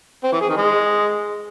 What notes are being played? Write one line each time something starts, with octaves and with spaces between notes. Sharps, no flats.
C4
E3
G#4
D#3
G#3